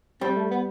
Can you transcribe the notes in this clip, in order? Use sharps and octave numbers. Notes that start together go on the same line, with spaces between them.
G3 C4
A3
B3